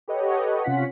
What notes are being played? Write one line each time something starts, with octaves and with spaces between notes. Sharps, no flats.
G4 A4 B4 C#5 D#5 F#5
C3 C#4 F4 F#5 B6